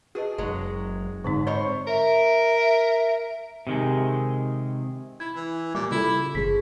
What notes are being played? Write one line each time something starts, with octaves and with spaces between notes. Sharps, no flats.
F#4 G#4 B4 D#5
F#1 F#3 G#3
G#2 D3 C4 D#4
C4 C5 C#5 D#5 B5
A#4 E5
C3 D#3 G#3
E4 G#6
E3
A#2 G3 D6
C#3 E4 F4 A4
G1 F3 G#4 B6